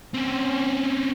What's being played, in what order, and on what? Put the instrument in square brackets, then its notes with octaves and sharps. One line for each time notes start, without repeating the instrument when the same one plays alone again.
[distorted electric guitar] C4 C#4